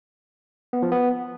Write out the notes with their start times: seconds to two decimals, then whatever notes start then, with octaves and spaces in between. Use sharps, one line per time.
0.73 B3
0.82 F3
0.92 B3